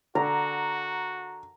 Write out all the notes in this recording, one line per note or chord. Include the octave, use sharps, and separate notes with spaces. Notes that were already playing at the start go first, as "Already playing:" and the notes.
D3 F#4 A#5